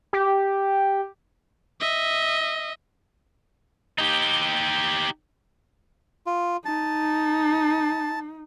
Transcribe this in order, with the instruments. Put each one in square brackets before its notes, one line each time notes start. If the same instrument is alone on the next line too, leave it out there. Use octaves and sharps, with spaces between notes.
[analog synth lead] G4
[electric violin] D#5 E5
[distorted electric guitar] D#4 G4
[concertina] F4
[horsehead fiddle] D#4 [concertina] A5